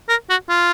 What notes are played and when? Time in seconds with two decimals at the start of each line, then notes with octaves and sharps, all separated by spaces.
0.09 A#4
0.30 F#4
0.49 F4